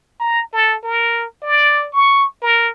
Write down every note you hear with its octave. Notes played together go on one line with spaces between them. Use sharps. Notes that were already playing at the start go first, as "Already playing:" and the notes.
A#5
A4
A#4
D5
C#6
A#4